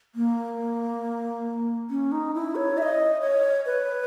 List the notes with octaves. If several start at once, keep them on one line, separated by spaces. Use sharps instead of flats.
A#3
C#4
D#4
E4
C#5
E5
D#5
C#5
B4